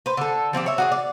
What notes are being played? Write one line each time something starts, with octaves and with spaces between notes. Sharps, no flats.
B4 C5
D3 A4
F3 C4 F4 G4
C#5 E5
F#4 G#4 D5
D5